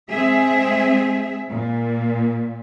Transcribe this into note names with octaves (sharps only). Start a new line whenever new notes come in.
G#3 C4 G#4 E5
A#2